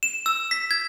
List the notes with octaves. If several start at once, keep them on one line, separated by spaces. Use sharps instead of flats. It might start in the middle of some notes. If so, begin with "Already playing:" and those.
E7
E6
B6
G#6